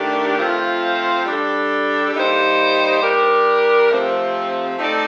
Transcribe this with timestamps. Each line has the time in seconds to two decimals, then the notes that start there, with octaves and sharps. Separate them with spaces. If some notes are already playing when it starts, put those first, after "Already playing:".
Already playing: D#3 A3 D4 G4
0.38 F3 A3 C4 F4 C5
1.26 G3 D4 A4
2.14 G3 A#3 D#4 G4 C5
3.01 G3 D4 G4 A#4
3.90 C3 F3 A3 C4
4.78 A3 C4 D#4 A4 D5